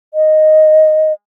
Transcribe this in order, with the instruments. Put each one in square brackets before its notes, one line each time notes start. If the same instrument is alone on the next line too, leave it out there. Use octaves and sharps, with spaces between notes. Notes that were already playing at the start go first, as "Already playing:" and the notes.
[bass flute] D#5